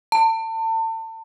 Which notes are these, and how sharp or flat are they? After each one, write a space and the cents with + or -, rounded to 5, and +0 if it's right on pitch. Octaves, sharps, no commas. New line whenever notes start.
A5 +35